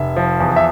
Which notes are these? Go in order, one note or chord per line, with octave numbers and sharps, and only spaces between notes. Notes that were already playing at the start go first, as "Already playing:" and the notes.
Already playing: F1 E5
F3
E2
E5